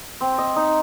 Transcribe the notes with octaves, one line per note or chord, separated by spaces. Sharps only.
C4
D#5
D#4